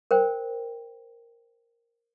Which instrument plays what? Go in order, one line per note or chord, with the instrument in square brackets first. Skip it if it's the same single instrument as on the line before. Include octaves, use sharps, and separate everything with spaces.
[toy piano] A#4 C5 G5